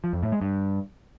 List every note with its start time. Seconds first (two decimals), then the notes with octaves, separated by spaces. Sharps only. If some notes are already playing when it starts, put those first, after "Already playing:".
0.04 F3
0.13 F2
0.23 A2
0.32 G#3
0.42 G2